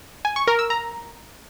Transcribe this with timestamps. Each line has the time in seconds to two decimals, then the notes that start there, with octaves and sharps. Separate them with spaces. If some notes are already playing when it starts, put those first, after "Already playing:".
0.25 G#5
0.36 C#6
0.47 A#4
0.59 E6
0.70 A#5